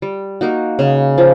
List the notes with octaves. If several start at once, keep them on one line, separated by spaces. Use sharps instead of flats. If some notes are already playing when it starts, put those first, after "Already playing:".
G3
A#3 D#4 F#4
C#3
F3